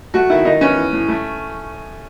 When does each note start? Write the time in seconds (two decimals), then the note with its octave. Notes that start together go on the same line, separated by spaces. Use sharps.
0.14 A3 F#4
0.30 D#3 E4
0.45 D#3 D#4
0.61 B3 C#4
0.76 E3
0.93 A2
1.08 A3